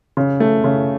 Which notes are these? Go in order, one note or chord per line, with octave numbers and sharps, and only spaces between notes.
C#3
A3
C#3